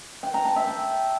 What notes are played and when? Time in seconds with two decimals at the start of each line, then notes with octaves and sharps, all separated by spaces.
0.23 G5
0.34 A#5
0.45 A5
0.56 E5
0.67 G5